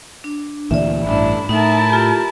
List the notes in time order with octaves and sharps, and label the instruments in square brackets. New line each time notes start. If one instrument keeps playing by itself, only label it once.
[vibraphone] D4
[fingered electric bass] D2 A#2 E3 [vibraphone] D5 E5
[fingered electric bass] A1 [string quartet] G2 D4 E4
[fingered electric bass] A2 [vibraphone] D#4 E5 [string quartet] E4 A#4 A5
[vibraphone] F4 G4